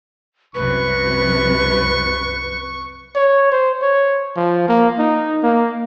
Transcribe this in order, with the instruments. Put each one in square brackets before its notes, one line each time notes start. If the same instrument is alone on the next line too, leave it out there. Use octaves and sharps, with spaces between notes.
[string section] C2 F#2 C3 [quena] B4 [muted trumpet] C#6
[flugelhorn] C#5
C5
C#5
F3
A#3
D#4
A#3